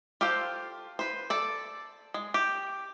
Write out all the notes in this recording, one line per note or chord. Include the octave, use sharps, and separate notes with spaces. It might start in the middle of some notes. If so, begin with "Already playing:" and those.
F4 G4 A4 C5 F5
B4 C5
A4 D5
G#3
G4